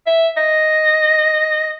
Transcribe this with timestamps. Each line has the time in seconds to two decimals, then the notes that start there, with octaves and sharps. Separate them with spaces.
0.07 E5
0.37 D#5